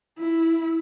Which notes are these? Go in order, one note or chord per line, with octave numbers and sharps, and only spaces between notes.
E4